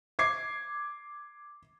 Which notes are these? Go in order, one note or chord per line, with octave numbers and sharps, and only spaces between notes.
D6 G#6 C7